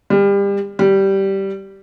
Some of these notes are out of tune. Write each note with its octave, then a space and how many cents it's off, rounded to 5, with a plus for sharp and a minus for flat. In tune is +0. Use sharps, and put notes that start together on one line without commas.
G3 +30
G3 -10